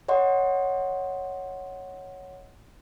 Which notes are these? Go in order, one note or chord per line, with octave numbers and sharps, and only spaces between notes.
C#5 D#5 F#5 C6